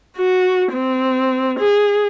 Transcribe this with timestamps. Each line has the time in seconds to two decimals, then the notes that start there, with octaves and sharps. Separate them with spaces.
0.17 F#4
0.73 C4
1.59 G#4